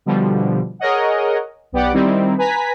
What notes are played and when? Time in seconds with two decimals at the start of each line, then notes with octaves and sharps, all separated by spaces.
0.06 B2 D3 F3 G3
0.79 G#4 A#4 C#5 D#5 F#5
1.72 B1 B3 G4 D5 F#5 D6
1.93 D#3 G3 C4 D#4 E4
2.38 B4 G#5 A#5 B6